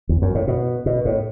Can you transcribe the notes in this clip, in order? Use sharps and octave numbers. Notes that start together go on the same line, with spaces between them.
E2
F#2
A2
B2
B2
A2